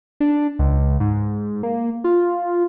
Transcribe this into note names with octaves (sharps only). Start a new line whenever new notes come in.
D4
C#2
G#2
A#3
F4